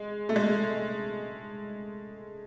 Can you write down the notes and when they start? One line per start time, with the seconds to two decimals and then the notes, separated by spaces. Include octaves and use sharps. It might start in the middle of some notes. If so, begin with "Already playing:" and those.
Already playing: G#3
0.29 A3
0.36 G#3